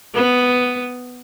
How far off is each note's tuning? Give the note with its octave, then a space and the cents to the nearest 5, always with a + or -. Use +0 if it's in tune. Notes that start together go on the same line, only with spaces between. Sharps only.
B3 +5